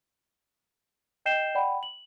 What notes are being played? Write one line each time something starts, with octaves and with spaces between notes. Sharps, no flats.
D#5 G5 G6 C7 E7 G7
D5 F#5 G5 B5
F#7